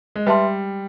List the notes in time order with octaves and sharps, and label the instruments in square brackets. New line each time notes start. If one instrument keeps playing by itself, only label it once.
[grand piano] G#3
[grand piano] G3 [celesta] B4 E5 A5 C6